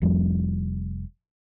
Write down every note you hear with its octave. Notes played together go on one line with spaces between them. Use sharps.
F1 F2 F3 G3